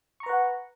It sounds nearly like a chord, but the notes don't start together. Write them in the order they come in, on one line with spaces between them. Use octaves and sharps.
C#6 A#5 B4 F#5